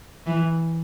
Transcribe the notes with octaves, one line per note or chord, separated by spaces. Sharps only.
E3